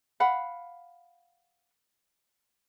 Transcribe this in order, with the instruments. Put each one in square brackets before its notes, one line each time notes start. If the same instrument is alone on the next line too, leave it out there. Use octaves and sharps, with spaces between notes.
[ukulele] F5 F#5 B5